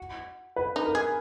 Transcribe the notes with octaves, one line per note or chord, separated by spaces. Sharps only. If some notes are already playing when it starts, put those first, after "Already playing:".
Already playing: F#4
B4
D#4
A#4
G#4